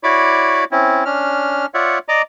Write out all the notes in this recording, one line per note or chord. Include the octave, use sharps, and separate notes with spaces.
E4 F#4 C#5 D5 B5 D6
C4 C#4 E4
C#4 D4 F6
F4 C#5 D5 E5 F#5
D5 D#5 A#5 D6